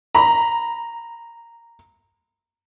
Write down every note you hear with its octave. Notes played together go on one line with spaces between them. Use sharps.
A#5 B5